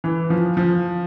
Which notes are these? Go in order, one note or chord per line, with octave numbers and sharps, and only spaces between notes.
E3
F3
F3